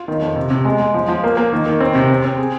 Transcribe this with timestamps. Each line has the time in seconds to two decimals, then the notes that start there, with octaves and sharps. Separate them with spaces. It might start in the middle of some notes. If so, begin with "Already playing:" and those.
Already playing: F4
0.08 D#3
0.22 F2
0.36 C3
0.50 C3
0.65 G#3
0.79 G#3
0.94 F3
1.08 F3
1.24 A#3
1.37 A#3
1.53 D#3
1.66 D#3
1.80 C4
1.95 C3
2.10 C4
2.25 C4
2.38 G#4